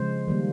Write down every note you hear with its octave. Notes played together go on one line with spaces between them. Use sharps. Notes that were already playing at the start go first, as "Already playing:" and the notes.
Already playing: C#3 F3 G#3 C5
D#3 G3 A#3